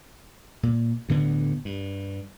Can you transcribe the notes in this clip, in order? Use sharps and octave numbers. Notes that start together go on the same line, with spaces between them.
A#2
D2 A2 D3 B3
G2